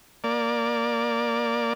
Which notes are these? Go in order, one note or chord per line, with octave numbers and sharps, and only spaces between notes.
A#3 D5